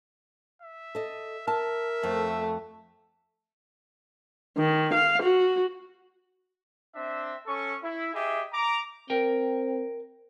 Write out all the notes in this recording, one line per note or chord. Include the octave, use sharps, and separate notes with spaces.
E5
A4 D#5
A#4 E5 A5
F2 A3
D#3
F5
F#4
C4 D4 E5
C#4 A4 C#6
E4
G4 G#4 D#5 E5
A#5 D6
C4 A#4 G5